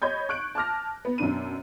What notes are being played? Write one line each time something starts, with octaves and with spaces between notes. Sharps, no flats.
C#5 D#5 B5 G6 G#6
C#6 F#6 D7
A5 D6 F6 A#6
B3
F#2 B2 D4 D#7